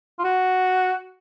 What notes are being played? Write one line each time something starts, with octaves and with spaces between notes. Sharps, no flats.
F4
F#4